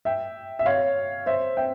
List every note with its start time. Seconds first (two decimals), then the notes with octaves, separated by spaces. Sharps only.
0.05 E5 G5
0.59 E5
0.66 C#5 F5
1.26 C5 E5
1.57 E5 G5